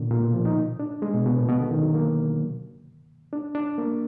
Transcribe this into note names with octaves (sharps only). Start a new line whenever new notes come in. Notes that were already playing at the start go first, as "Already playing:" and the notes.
Already playing: A#2 D3
A#2
B2
F3
D#4
D4
G#3
B2
B2
A#2
B2
D3
D#3
F#3
A#3
D4
D4
A#3